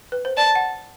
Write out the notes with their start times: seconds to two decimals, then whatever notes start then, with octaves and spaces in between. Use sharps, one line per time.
0.12 B4
0.25 C5
0.37 D5 A5
0.55 F#5